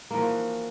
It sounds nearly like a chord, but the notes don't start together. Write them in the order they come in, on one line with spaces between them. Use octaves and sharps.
A#3 E3 F3 F#4